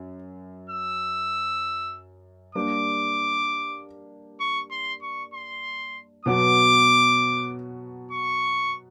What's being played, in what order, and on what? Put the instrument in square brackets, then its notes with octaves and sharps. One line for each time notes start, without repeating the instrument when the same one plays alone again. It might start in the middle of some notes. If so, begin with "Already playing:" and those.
Already playing: [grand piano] F#2
[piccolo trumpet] E6
[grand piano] G3 A#3 D4 G4 [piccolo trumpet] D6
[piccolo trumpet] C#6
C6
C#6
C6
[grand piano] B2 F#3 B3 [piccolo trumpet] D6
[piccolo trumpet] C#6